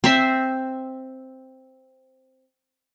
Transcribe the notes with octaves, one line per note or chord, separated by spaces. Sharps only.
C4 C5 E5